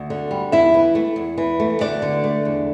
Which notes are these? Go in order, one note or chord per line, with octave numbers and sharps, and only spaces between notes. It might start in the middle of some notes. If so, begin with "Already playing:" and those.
Already playing: D2
D3
G3
E2 E4 E5
E3
A3
E2
E3
A3
D2 D4 D5
D3
A3
E2